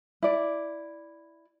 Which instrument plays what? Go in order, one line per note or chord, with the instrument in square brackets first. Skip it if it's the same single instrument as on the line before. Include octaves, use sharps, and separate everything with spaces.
[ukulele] E4 D5